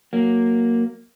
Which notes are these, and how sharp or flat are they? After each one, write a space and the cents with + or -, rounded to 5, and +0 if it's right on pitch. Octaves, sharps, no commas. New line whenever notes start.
F#3 +0 A#3 +0